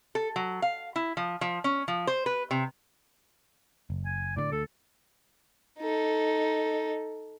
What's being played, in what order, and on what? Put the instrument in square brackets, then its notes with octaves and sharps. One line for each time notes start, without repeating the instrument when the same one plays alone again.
[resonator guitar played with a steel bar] A4
F#3
F5
E4
F3
F3
C#4
F3
C5
B4
C3
[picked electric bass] F#1
[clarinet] G#5
[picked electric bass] A2 D3 [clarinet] D5
[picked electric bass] D2 [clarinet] A4
[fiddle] D#4 A4